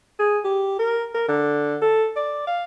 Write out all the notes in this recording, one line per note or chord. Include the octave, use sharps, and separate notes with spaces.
G#4
G4
A#4
A#4
D3
A4
D5
F5